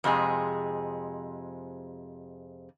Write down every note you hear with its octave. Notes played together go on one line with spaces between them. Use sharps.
F2 C3 G#3 G#4